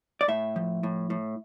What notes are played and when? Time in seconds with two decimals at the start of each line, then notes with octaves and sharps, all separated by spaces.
0.21 D5
0.28 A2 E5
0.56 F3
0.83 A2
1.10 A2